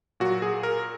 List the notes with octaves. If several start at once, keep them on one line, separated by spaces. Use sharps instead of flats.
A#2 F#3 F#4
G#4
A#4